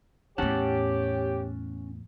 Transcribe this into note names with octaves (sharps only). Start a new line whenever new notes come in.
E2 A2 C#4 G4 C#5 F#5 A5